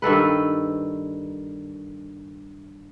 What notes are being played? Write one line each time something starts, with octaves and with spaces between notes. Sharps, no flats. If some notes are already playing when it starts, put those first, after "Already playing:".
G2 D#3 A4 B4